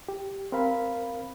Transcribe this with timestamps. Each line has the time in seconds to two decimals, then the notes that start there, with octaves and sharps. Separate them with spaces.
0.09 G4
0.52 C4 A#4 F5 B5